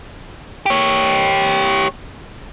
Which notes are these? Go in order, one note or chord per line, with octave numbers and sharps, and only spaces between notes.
G4 C#5